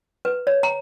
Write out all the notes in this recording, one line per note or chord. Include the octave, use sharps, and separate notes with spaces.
B4
C#5
A#5